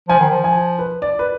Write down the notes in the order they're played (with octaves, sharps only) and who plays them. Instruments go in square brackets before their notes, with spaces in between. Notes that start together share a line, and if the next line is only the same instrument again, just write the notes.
[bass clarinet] F3 [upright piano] G#5
[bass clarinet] D#3
F3
[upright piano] G#5
B4
D5
B4